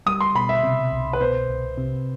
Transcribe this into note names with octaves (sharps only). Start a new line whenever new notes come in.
G3 D#6
C6
B2 B5
E5
C3
C2
B4
B2 C5
C2
C3